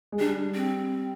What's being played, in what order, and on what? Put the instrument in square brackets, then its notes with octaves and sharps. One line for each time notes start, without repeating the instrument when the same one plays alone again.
[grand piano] G#3
[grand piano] G3 [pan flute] D4
[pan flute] C4